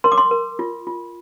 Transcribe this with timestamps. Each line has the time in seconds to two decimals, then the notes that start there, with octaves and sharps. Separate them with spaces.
0.04 A#4 C6
0.12 D6
0.18 C6
0.31 A#4
0.59 F4
0.87 F4